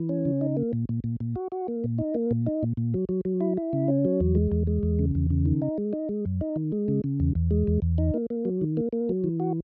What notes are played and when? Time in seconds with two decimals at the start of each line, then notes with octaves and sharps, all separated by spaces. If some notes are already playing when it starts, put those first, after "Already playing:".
Already playing: E3
0.09 C#4
0.25 C#3
0.41 D#4
0.57 A#3
0.73 A#2
0.89 A#2
1.04 A#2
1.20 A#2
1.36 F#4
1.52 F#4
1.68 A#3
1.84 A#2
1.98 D#4
2.14 A#3
2.31 A#2
2.46 D#4
2.63 A#2
2.77 A#2
2.94 F#3
3.09 F#3
3.25 F#3
3.41 E4
3.57 E4
3.73 C#3
3.88 C#4
4.05 F#3
4.20 E2
4.35 G#3
4.52 E2
4.67 G#3
4.83 E2
4.99 C#3
5.15 E2
5.30 C#3
5.46 D#3
5.62 D#4
5.78 G#3
5.93 D#4
6.09 G#3
6.25 F#2
6.41 D#4
6.56 D#3
6.72 G#3
6.88 C#3
7.04 C#3
7.20 E2
7.35 E2
7.51 G#3
7.67 E2
7.82 E2
7.98 D#4
8.14 A#3
8.30 A#3
8.45 F#3
8.61 D#3
8.77 A#3
8.93 A#3
9.09 F#3
9.24 E3
9.40 F#4